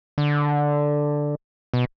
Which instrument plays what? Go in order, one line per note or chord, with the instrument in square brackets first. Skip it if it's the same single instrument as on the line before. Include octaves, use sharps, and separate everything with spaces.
[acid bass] D3
B2